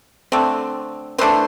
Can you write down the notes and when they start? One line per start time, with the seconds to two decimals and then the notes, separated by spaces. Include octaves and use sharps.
0.32 D3 A3 C4
1.18 E3 A3 D4 C5